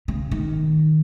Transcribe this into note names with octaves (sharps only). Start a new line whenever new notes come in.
C#3
D#3